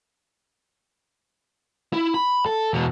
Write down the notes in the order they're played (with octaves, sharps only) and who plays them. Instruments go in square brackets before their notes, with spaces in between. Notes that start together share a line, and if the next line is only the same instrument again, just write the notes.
[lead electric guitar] E4
B5
A4
E2 B2